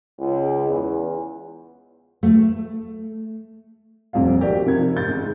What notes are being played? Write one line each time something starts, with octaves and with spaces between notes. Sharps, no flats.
C#2
E2
A3
D#1 F2 C4 F5
D#4 F#4 G4 A#4 D5
C3 F3 A#4 G#6
G#2 G6 A6
G#3